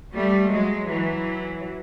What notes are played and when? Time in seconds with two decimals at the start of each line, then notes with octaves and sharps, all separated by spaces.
0.15 G3 A3
0.51 F#3 G#3
0.87 E3 F#3